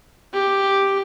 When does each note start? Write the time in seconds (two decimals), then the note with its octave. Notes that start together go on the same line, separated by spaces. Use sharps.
0.33 G4